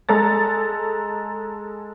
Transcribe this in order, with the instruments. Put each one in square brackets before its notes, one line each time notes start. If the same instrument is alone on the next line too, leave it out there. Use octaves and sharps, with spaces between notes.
[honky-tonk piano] G#3 A4 A#5 A6